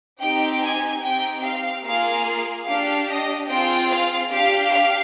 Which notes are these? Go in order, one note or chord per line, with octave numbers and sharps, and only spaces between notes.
C4 D#4 G4 G5
G#5
C4 D#4 G4 G5
F5
A#3 F4 G#4 F5
D4 G4 F5
D#5
C4 F4 G#4 G5
F5
D4 G4 F5
F5